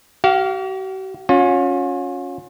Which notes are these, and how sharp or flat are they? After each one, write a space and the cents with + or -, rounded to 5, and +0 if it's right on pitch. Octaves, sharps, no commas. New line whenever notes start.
F#4 +45 F5 +0
C#4 +0 F4 +45